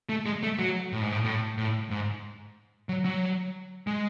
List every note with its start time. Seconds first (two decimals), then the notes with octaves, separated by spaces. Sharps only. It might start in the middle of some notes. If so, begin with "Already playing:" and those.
0.09 A3
0.26 G#3
0.43 A3
0.59 F#3
0.92 A2
1.02 G#2
1.12 A2
1.24 A2
1.57 A2
1.90 G#2
2.89 F#3
3.04 F#3
3.87 G#3